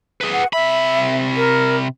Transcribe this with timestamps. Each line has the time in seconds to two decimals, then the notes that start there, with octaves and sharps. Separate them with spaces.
0.21 G#4 B4
0.32 F#5
0.53 C3 E5 B5
1.36 A#4